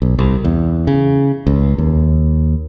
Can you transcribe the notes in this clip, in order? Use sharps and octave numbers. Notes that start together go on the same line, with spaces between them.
B1
C2
E2
C#3
C#2
D#2